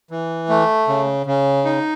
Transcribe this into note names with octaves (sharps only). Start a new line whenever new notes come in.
E3
A3
C#3
C#3
D#4